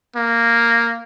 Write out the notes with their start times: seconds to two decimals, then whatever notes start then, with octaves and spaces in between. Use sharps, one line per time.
0.16 A#3